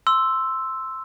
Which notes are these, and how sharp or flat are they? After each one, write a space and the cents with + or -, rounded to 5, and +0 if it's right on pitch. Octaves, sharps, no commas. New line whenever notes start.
C6 +0 E6 +0